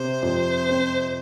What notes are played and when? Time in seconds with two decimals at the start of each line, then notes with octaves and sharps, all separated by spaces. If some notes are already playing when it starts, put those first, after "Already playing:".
Already playing: C3 C5
0.23 F2
0.69 C4